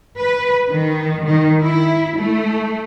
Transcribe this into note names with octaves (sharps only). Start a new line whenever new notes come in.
B4
D#3
D#3
E4
A3